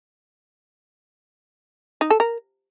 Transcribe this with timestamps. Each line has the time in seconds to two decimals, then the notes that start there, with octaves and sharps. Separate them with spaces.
2.01 D#4
2.10 A4
2.20 A#4